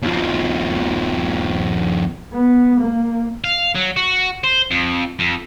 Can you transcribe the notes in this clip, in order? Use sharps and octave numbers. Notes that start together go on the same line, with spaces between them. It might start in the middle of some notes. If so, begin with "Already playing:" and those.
D#2 F3
B3
A#3
F5
F#3
F#4
C5
F2
F2